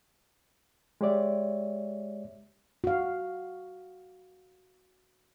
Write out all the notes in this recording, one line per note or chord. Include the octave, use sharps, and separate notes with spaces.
G#3 G4 C#5 D5 E5
F#4 F5